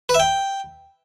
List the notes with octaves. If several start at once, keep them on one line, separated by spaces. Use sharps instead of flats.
B4
E5
G5